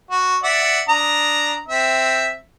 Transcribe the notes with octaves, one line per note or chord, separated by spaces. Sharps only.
F#4
D5 E5 F#5
D4 A#5 D#6
C4 E5